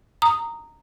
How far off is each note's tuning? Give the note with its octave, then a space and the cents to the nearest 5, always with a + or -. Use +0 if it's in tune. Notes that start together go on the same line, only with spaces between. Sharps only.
A#5 -10 D#6 +0